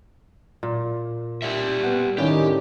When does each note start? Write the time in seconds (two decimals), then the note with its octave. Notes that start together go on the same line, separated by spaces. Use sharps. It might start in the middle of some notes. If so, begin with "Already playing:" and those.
0.63 A#2
1.42 G4 D5 E5
1.83 B3 F#5
2.18 A2 D3 D#3 C#4 G4